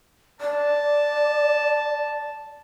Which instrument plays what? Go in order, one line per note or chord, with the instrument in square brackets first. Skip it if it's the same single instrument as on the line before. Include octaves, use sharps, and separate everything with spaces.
[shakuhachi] D5 [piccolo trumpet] A5